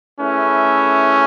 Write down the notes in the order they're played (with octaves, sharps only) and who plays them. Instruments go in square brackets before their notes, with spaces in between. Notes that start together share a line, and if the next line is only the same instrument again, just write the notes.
[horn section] A3 E4 G#4 B4 E5 [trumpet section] C#4